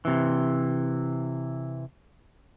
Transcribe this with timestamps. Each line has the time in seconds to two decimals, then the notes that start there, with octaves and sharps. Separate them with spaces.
0.05 C3 E3